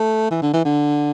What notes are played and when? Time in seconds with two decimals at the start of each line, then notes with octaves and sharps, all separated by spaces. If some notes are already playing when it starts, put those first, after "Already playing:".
Already playing: A3
0.31 E3
0.42 D3
0.54 E3
0.65 D3